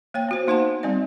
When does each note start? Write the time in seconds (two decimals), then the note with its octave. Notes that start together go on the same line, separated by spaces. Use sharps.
0.14 A#3 C#5 G5
0.29 B3 F#4 C5
0.47 A#3 D#4 C5 F#5 A5
0.83 G3 C4 D#4 D5 F5